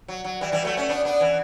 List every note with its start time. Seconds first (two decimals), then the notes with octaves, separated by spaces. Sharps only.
0.08 F#3
0.24 F#3
0.41 E3 G3
0.52 E3 G3
0.65 F#3 A3
0.77 A3 C#4
0.89 B3 D4
1.05 B3 D4
1.21 E3